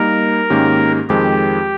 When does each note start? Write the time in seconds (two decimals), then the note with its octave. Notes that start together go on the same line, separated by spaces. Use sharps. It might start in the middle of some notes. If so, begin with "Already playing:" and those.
Already playing: G3 A#3 D#4 A#4
0.50 G#2 D#3 A#3 C#4 G4
1.09 F2 D#3 G#3 C4 G4